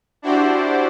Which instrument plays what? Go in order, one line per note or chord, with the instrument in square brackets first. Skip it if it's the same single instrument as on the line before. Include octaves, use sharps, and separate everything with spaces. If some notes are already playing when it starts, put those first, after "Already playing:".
[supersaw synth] D4 E4 F#4 G4 C5 D5